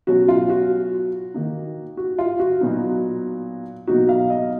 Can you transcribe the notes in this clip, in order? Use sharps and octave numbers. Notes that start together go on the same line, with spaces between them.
B2 F#3 C#4 F#4
F4
F#4
D#3 A#3 D#4
F#4
F4
F#4
A#2 F#3 B3 D#4
B2 F#3 A#3 D#4 F#4
F5
D#5